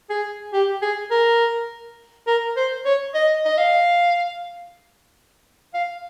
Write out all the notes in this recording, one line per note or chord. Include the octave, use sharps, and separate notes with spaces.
G#4
G4
G#4
A#4
A#4
C5
C#5
D#5
D#5
F5
F5